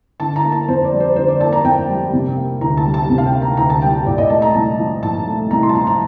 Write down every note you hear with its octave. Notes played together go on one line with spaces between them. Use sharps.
D3 A5
A#5
A#3
A5
F2 C5
D5
G3
C5
D3 C5
D5
A#3 A5
A#5
F2 G5
G3
C3
A#3
D2 A#5
A5
G3
A5
C3
F5
G5
A#3
A#5
D2 A#5
A5
G3 G5
A#2 D5
D#5
A3 A5
A#5
C2 A5
F3
A#2 A5
A3
C2 A#5
C6
A5
F3 A#5
A#5